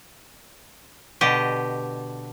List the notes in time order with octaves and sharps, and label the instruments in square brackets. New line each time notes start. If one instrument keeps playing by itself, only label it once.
[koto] B2 D3 G4 D#5